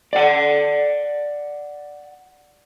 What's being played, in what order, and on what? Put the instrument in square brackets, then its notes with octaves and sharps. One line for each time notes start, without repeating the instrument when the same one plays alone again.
[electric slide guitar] D5 F#5